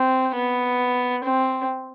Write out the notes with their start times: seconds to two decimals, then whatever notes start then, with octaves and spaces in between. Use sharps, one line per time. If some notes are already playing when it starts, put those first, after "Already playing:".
Already playing: C4
0.35 B3
1.24 C4